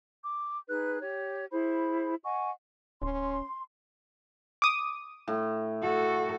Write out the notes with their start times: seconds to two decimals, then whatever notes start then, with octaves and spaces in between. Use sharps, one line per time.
0.23 D6
0.68 D#4 G#4 B4 F#6
1.00 G4 C#5
1.51 E4 G#4 C5 B5
2.24 D#5 F#5 G#5 C#6
3.02 D1 C#4 C6
4.62 D6 D#6
5.28 A2
5.82 F#4 A4